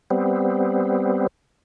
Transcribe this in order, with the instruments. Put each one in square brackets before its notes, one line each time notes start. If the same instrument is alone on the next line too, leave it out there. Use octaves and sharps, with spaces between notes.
[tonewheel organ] G3 B3 C4